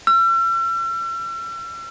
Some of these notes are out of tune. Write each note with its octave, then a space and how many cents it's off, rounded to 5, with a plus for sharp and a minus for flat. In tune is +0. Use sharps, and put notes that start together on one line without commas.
E6 +45